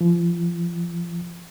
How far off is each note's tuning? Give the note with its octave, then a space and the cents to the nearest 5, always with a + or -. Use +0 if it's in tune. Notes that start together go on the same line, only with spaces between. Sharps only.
F3 -30